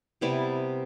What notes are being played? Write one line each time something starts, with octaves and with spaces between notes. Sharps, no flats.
C3 G3 B3 E4 D5